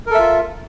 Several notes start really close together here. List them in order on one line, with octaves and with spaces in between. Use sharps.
A#4 A4 E5 F4